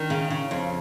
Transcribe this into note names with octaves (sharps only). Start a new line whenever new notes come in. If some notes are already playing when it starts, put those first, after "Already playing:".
Already playing: D#3 D4
C#3
C#3
F2